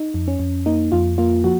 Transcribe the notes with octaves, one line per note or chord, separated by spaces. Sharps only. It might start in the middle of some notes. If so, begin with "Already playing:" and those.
Already playing: D#4
F2
C#4
F2
A#3 D#4
F2 F4
A#3 F4
F3 F#4